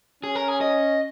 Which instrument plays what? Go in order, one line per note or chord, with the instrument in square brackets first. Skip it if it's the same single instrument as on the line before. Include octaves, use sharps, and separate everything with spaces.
[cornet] C#4 [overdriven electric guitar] G#4
[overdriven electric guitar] A#4
G#4
D#5